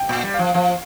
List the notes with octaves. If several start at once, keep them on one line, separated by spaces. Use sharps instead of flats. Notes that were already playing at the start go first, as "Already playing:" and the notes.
Already playing: G5
A#2
G3
F3 F5
F3 F5